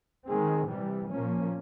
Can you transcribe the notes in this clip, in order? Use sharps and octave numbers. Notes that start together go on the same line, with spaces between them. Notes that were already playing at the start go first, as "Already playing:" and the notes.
D#3 G#3 C4 G#4
C3 E3 G3
A#2 F3 A#3 C#4